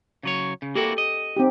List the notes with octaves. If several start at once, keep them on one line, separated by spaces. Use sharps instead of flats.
C#3 F#3 C#5
C#3
A#3 E4 F#4 G4 A4
D#5
C4 D#4 G4